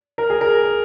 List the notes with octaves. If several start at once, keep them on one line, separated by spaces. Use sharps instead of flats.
A#4
G#4
A#4